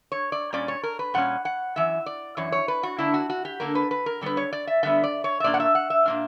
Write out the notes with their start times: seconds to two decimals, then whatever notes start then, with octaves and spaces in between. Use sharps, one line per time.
0.12 C#5
0.32 D5
0.53 A#2 G3 C#4 D5
0.68 C#5
0.83 A#4
0.99 B4
1.14 A#2 G3 C#4 F#5
1.45 F#5
1.76 F#2 E3 E5
2.06 D5
2.37 F#2 E3 C#5
2.52 C#5
2.68 B4
2.83 F#4
2.98 D3 A#3 D4 E4
3.14 F#4
3.30 F#4
3.45 G4
3.60 D3 A#3 D4 A#4
3.75 B4
3.91 B4
4.06 A#4
4.21 D3 G3 B3 B4
4.37 C#5
4.53 D5
4.67 E5
4.83 D3 G3 B3 E5
5.03 D5
5.24 C#5
5.40 E5
5.44 A#2 A#3 D4 D5
5.54 F#5
5.60 E5
5.75 F#5
5.90 E5
6.05 A#2 A#3 D4